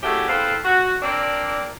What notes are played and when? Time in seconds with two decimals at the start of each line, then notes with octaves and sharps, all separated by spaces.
0.03 G#3 A3 C#4 E4 F#4 G4
0.27 E2 C4 A4 B4 C5 F5
0.64 F#4
1.02 A#3 C4 D4 D5